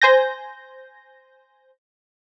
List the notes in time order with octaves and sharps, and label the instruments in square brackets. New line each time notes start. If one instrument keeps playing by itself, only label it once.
[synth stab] C5 G#5 G6 A#6